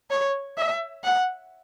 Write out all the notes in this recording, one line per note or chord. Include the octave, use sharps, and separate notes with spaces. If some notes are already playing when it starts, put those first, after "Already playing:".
C#5
E5
F#5